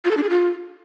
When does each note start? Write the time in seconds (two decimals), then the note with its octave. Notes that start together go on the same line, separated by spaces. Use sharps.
0.05 F4
0.11 A4
0.17 D4
0.23 G#4
0.29 F4